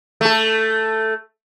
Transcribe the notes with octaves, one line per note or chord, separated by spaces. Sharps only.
A3 A4